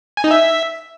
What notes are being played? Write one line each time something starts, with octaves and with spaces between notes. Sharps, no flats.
G#5
D#4
E5